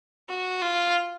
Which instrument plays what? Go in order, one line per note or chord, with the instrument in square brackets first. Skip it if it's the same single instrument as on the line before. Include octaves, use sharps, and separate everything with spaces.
[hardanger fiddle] F#4
F4